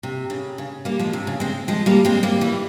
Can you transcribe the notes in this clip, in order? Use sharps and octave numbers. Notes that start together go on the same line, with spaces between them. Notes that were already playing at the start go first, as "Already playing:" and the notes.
C3
C#3
C#3
G3 A#3
F3 G#3
C3
C#3
G#3 C4
F3 G#3
G3 A#3
G#3 C4
G3 A#3
E3 G3